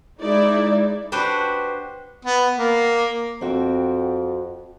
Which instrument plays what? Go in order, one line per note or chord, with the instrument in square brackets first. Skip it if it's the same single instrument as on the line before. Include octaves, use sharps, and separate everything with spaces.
[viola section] G#3 D#4 E4 D5
[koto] D4 F#4 G4 B4 C5
[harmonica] B3
A#3
[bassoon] F2 [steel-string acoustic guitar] C4 F#4 G5